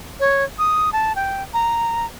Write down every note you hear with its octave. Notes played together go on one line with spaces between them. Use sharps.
C#5
D#6
A5
G5
A#5